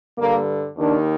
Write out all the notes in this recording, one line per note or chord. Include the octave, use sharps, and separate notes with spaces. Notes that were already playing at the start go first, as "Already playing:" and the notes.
G2 D3 A#3
D#2 D#3 D4